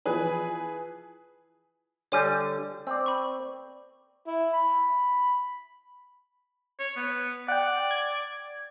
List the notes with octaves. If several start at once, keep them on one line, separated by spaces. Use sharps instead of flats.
E3 F3 G#4 B4
D3 G3 C#5 G#5 G6
C4 D5 E6
B5 C#6
E4
B5
C#5
B3
D5 F#5 G5
G#6